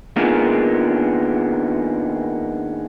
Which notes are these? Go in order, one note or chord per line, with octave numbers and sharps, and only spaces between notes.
D#3 G#3 A#3 B3 D4 F4